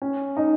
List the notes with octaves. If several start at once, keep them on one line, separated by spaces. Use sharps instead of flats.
C#4
D#4